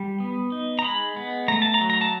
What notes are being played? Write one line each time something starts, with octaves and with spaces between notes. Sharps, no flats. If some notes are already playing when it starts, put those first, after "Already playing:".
Already playing: G3
B3
D#4
A#5
G#3 B5
B3
A3 A#5
A5
A#5
F#3
A#5
A5